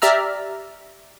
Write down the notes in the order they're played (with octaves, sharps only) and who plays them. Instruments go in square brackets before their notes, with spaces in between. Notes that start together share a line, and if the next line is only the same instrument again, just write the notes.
[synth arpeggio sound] G4 D5 E5 A#5 E6 F6